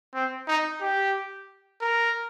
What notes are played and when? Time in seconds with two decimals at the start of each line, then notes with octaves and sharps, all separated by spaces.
0.14 C4
0.48 D#4
0.81 G4
1.81 A#4